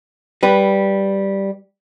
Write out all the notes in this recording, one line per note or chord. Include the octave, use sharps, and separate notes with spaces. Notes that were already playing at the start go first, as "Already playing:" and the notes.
G3 B4